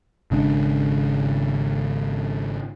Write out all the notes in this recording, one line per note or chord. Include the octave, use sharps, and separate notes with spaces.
G#1 C#3 G#3 D4